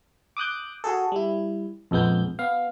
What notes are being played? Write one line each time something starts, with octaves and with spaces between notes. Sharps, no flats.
D6 D#6 F#6 G6
F#4 G#4 A4
G3 E4
A#1 F2 G#3 B3 G6
B3 F5